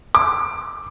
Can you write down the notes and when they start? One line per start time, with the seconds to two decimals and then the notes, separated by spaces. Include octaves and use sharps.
0.15 D6